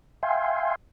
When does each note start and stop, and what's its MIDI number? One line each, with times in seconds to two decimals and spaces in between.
0.23 0.75 76
0.23 0.75 77
0.23 0.75 79
0.23 0.75 80
0.23 0.75 84